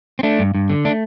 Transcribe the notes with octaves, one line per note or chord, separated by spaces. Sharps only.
C4
A3 D4
G2
G2
D3
A3 D4